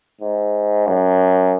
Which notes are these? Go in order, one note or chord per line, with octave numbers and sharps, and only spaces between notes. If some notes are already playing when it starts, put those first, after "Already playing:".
G#2
F#2